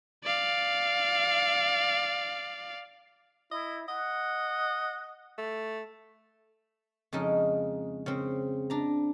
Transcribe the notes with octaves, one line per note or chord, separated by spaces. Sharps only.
D5 F5
E4 D#5
D#5 F#5
A3
F2 C#3 G#3 D#4
C#3 C4
D4 A#5